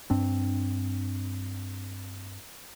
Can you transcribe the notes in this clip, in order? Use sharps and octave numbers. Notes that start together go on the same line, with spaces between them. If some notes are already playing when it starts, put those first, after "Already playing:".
G2 C4 D4